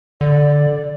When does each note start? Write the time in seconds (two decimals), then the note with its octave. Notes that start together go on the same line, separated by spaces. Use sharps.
0.21 D3 D5